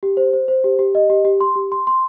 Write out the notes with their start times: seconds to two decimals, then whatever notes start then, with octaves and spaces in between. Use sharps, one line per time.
0.03 G4
0.17 C5
0.33 C5
0.48 C5
0.64 G4
0.79 G4
0.95 D#5
1.10 G4
1.25 G4
1.41 C6
1.56 G4
1.72 C6
1.87 C6